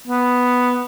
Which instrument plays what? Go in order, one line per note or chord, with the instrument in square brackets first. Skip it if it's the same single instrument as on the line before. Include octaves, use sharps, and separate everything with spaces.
[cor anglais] B3